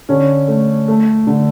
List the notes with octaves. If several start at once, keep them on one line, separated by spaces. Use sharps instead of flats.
D3 C#4
A3
A3
D3